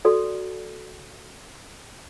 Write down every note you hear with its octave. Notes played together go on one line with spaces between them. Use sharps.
F#4 A4 D5